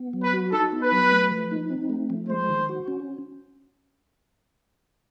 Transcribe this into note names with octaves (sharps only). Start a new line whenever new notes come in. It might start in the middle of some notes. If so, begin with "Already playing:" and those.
Already playing: B3
F#3
B4
F#4
D#4 A4
B3
B4
F#3
A3
F3
D#4
C4
A3
F3
G#3 C5
D#3
F#4
C#4